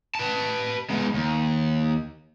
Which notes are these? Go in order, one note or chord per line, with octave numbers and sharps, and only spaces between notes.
B4 A5
G#3 B3
D#2